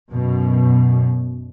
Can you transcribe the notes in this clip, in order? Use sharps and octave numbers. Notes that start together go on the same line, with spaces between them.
F#2 B2